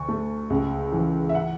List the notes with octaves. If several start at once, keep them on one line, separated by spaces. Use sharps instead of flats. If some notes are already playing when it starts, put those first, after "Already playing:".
Already playing: D2 C#6
A3
C#2
E3
E5
F#5